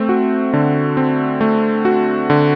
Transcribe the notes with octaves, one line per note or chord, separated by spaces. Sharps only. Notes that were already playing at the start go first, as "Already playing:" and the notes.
Already playing: A3 C4
F#4
D3
C4
A3
F#4
D3